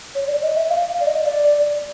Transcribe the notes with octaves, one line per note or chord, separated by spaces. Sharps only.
C#5
D5
D#5
E5
F5
F5
D5
D#5
D5